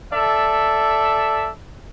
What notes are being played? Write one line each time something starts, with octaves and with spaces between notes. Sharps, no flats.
A4 D5 E5